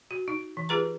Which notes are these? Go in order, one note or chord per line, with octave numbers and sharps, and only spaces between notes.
F#4
D#4
E3
F4 G4 G#4 B4 A#5